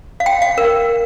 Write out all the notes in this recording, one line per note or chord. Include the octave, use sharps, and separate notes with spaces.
F5
G5
F5
A#4